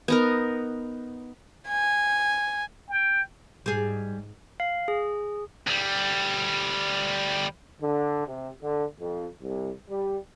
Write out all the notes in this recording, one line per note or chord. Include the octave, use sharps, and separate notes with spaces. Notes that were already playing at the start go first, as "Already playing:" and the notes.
B3 D#4 A#4
G#5
G5
G#2 G3 G#4
F5
G#4
D2 G3
D3
C3
D3
F2
C2
G3